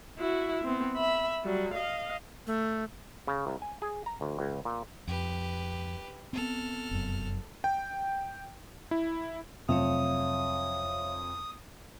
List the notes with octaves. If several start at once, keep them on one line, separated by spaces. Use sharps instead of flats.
E4 F#4
B3 C4
E5 B5
F#3 G3
D#5 F5
A3
C#3
C2
G#5
G#4
A#5
D2
C#2
A#2
F2 G4 B4
B3 C4 A4 F6
F1 F#2
G5
E4
F2 C3 F#3 A3 C#5 E5 F5 D#6